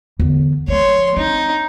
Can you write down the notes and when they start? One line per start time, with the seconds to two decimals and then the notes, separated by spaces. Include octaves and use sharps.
0.19 E2 D3
0.68 F3 G#3 C#5 C6
1.17 C4 D#4